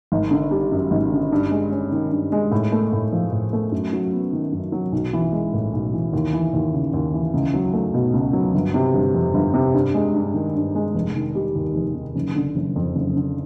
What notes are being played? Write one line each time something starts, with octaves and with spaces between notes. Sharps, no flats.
G#1
D3
G3
F#2
G#1
D3
G2
G#3
C#4
D#3
G2
G#3
A2
A3
A2
F3
A2
A3
F#2
F#3
B3
D#3
F#2
F#3
B1
E3
G#3
A2
B1
E3
D#2
E3
D#2
C#3
D#2
E3
C#2
F#3
A3
B2
C#2
F#3
G1
C3
G1
F2
G1
C3
G2
G#3
G2
D#3
G2
G#3
F1
D#3
G3
D#2
F1
D#3
F#1
D3
F#1
F2
F#1
D3